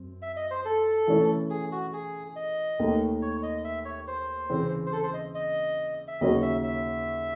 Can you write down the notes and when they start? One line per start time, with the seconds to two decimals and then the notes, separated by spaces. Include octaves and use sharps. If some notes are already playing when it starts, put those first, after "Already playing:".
Already playing: F#2 C4
0.22 E5
0.36 D#5
0.51 C5
0.65 A4
1.07 E3 A3 C#4 E4
1.50 G#4
1.72 F#4
1.93 G#4
2.36 D#5
2.79 D#2 D#3 A3
3.22 C#5
3.43 D#5
3.64 E5
3.85 C#5
4.07 C5
4.50 C#3 E3 C4
4.86 C5
4.92 A4
5.03 C5
5.14 D#5
5.35 D#5
6.08 E5
6.21 D#2 C#3 F#3 C#4 D#5
6.42 E5
6.63 E5